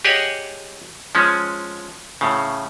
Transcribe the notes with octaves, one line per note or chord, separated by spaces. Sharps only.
G4 G#4 C#5 D#5 F#5
F3 G#3 C#4
A2 C#3